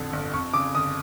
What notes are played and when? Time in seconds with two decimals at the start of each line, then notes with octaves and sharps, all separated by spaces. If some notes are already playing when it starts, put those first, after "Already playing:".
Already playing: A1 F2 D3
0.13 G1
0.34 F2 C#6
0.54 C#3 D6
0.74 G1 D#6